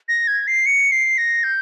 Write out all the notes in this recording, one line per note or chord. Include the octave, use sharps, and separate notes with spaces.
A#6
G#6
C7
C#7
C7
A#6
G6